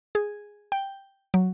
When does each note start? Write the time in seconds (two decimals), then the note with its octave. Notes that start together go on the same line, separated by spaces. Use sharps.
0.15 G#4
0.72 G5
1.34 F#3